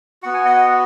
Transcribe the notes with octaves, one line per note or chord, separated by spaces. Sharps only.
B3 F#4 F#5
G#5
D#5 F#5